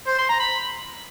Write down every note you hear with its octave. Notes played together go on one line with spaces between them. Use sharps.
C5
C6
A#5
B5